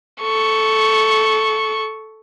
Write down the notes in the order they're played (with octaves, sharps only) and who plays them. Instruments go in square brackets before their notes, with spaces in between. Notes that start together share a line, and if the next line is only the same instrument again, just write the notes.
[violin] A4 C#6